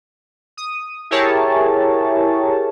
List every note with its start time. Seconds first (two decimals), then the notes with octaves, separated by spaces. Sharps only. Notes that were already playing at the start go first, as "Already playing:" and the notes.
0.57 D#6
1.11 E4 G4 G#4 A#4 C#5 A5